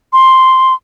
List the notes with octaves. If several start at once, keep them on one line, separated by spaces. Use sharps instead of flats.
C6